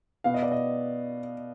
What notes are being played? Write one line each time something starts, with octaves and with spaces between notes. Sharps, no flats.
B2 B3 F5
D#5
D5
D#5